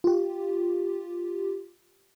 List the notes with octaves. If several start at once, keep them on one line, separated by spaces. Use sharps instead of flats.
F4 G4